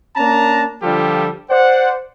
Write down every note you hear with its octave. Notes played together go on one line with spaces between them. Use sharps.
A#3 C#4 D4 A5 A#5
D3 F3 G3 F4 G4 A4
C5 D5 F#5